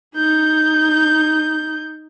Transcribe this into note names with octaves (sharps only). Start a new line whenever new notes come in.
D#4 G6